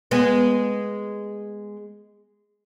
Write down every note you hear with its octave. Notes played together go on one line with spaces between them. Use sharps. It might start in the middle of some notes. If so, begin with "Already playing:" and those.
G#3 B3